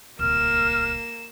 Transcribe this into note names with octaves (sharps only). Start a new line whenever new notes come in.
D1 C2 A#3 F6 E7